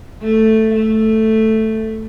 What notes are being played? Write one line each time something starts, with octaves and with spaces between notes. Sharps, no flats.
A3
A3